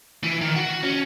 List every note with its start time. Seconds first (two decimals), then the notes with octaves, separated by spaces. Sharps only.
0.24 E3
0.41 D#3
0.56 F#4
0.83 C#4